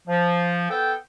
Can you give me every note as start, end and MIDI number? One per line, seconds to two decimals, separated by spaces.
0.08 0.69 53
0.71 0.95 59
0.71 0.95 69
0.71 0.95 79